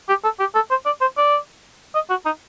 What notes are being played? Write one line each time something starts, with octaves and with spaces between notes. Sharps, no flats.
G4
A4
G4
A4
C5
D5
C5
D5
D#5
F#4
D#4